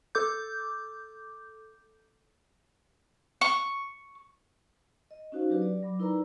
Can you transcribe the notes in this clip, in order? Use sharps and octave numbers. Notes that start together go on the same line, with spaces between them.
A4 D6 G6
C#6
D#5
C#4 D#4 F#4 C5 F5
F#3 D4 G4 B4 D5
D5
F#3 B5 D6
D#4 E4 A#4 B4 D5 A#5